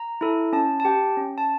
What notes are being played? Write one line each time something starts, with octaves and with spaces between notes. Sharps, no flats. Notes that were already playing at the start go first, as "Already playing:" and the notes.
Already playing: A#5
E4 A4
C#4 A5
A5
G4 G5
C#4
A5